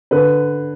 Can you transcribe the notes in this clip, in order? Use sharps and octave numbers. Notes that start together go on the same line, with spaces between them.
D3 B4